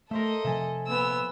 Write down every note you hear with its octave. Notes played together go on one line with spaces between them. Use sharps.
A3 A4 A#4 C5 D#5 E5
C3 F3 E5 G#5 A5
A#2 B3 E6